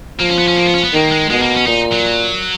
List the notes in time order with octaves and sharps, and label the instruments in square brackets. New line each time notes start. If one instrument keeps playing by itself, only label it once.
[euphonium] F3 [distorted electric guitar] A#3
[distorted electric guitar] C#4
B3
C#4
A#3
B3
C#4
B3
[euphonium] D#3 [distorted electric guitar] A#3
[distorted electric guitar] G#3
[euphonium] B2 [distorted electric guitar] G#3
[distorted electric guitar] A#3
C#4
[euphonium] A#2 [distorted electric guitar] D#4
[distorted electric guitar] F#3